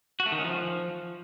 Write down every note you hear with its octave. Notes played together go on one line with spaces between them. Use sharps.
F#4
A3
D#3
C#4
F3